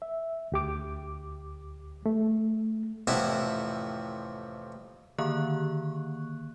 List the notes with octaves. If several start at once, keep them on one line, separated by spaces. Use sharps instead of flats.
E5
D2 G4 D6
A3
A1 F2 C3 E4 F#5 A5
D3 D#3 A#3 C#6 F#6